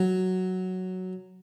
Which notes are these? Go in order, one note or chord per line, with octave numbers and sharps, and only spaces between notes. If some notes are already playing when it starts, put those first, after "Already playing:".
Already playing: F#3